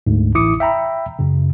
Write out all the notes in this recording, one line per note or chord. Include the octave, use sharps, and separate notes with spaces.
D2 G#2
A1 E4 D6 D#6 C#7
E5 G5 A#5 B5
F#2 C#3